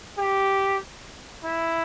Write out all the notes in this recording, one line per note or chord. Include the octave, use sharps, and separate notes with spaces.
G4
E4